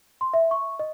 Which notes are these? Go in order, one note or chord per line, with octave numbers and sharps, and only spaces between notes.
C6
E5
C#6
D#5